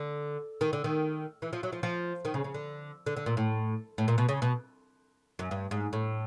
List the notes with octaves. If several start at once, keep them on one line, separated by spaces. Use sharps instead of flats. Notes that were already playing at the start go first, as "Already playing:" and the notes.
Already playing: D3
D#3
D3
D#3
E3
F3
F#3
F3
F3
D#3
C#3
C#3
D3
D3
D3
A#2
A2
A2
A#2
B2
C#3
B2
F#2
G2
G#2
A2